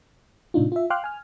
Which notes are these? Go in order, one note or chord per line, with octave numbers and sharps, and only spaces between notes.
A2 C3 D4 D#4 F4
F4 E5
F5 G5 C6 D6 F6 F#6
G#5 F6